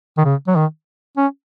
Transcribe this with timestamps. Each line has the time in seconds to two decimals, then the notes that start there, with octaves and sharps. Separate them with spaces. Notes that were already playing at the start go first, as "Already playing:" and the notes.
0.18 D#3
0.25 C#3
0.48 F#3
0.56 D#3
1.17 C#4